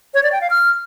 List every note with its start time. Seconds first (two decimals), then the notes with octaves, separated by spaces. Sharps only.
0.14 C#5
0.23 D5
0.32 G5
0.41 F5
0.50 F6